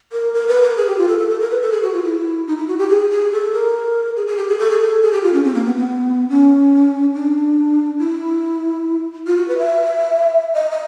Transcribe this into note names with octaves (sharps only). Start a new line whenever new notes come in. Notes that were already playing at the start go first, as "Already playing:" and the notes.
A#4
A#4
B4
A#4
G#4
G4
F4
A4
A4
A4
A#4
B4
A4
G#4
F#4
F4
E4
D#4
E4
F#4
G4
G#4
G#4
A4
A#4
G#4
G#4
G4
G#4
A4
G#4
A4
G#4
G4
F4
C#4
C4
A#3
B3
B3
C#4
D4
E4
F4
F#4
B4
E5
D#5
D#5